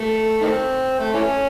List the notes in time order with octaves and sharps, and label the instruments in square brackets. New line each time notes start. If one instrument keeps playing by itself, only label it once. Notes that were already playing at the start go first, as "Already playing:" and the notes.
Already playing: [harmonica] A3
D#3 A3 C4
A3
E3 A3 C#4